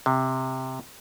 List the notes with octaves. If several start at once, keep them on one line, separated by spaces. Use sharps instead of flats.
C3